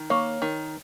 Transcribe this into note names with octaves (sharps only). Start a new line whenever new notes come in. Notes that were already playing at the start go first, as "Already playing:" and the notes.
Already playing: D#3
A#3 C#5
D#3